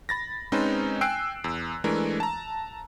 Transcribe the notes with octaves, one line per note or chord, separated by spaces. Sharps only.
B5 A6 A#6
G#3 C4 C#4 D#4 B4 C5
G5 G#5 E6 F#6 C7 D7
E2
E3 G#3 A3 D4 A#4
A5 A#5